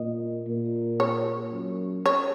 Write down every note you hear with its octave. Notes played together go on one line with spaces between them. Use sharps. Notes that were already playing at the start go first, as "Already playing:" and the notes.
Already playing: A#2 D#5
A#2
C#5
F#2
C#5